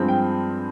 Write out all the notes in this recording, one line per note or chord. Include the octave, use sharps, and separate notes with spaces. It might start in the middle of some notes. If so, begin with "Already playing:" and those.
Already playing: G2 F3 G#3 C4
G5